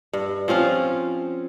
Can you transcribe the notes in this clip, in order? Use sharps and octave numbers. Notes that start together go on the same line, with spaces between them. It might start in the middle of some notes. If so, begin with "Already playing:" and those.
G2
F3 C4 C#4 F4